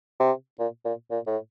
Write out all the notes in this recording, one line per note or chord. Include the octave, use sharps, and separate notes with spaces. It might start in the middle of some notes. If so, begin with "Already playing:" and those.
C3
A#2
A#2
A#2
A2